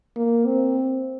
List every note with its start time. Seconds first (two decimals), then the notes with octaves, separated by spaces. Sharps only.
0.16 A#3
0.46 C4